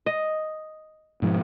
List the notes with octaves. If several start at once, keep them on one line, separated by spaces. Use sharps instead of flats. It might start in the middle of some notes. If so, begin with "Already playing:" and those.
D#5
G#2 B2 F3